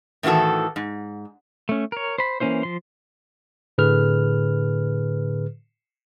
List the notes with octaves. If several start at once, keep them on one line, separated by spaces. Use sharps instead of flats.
A2 D#3 E3 F#4 A4
G#2
A3 C#4
A#4 C#5
C5 B5
E3 A#3 C#4 E4 C5
F3 C6
A2 D3 G#4 B4 F6